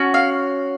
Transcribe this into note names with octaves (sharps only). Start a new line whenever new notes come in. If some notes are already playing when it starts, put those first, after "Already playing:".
Already playing: C#4 F#4
F5